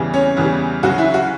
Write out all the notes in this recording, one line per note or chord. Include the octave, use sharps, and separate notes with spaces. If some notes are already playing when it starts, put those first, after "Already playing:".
Already playing: E2 C#3 E3 G3
C#4 C#5
E2 C#3 E3 G3
D2 C#3 F#3 F#4
E4
F#4